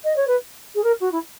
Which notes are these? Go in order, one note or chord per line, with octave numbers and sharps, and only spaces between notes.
D#5
C#5
B4
G#4
A#4
F#4
E4